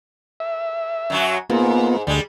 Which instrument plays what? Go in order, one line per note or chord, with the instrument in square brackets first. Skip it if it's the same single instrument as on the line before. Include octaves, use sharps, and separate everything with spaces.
[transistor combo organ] E5
[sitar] F#2 F#3 F#4
[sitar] G#2 [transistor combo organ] A#3 B3 F4
[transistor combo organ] D2 [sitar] G3 G#3